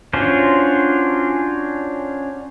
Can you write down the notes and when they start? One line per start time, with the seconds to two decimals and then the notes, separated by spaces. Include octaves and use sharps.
0.13 C#4 D4 F4 F#4 C5